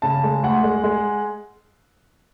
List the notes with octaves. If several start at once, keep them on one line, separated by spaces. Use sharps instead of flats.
C#3 A5
G#3
D2 F#5
G#3
G#3